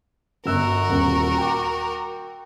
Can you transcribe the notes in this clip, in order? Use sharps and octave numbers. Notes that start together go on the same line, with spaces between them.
G1 F#4 A#4 E6 F#6
D#1
G5 D6